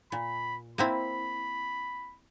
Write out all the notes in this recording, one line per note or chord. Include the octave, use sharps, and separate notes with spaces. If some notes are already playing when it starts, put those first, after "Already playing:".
A#2 B5
A#3 C4 E4 B5